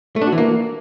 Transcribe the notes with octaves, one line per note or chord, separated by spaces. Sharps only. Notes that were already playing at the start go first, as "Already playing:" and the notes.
A3
D4
F#4
E3
A#3